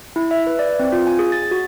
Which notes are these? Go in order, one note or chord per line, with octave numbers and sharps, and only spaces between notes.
E4
E5
B4
D5
C4
F4
G#5
G#4
A6
F#4